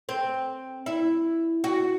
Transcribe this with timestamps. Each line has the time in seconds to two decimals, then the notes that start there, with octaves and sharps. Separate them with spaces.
0.09 C4
0.86 E4
1.64 F#4